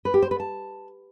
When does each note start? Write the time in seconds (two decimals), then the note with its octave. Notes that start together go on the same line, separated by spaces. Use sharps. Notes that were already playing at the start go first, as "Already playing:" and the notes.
0.05 B4
0.14 G4
0.22 C5
0.31 B4
0.40 A5